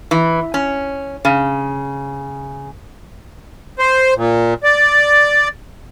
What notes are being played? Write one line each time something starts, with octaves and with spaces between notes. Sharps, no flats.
E3
C#4
C#3
C5
A#2
D5